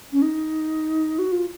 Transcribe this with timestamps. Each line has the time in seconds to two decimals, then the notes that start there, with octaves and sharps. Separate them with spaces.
0.12 C#4
0.22 D#4
1.18 F#4
1.32 F4